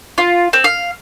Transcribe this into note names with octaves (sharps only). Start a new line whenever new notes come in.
F4
C4
F5